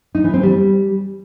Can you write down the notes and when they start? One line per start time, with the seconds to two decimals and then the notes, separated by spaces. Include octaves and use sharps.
0.15 D#4
0.24 E3
0.34 C4
0.43 G3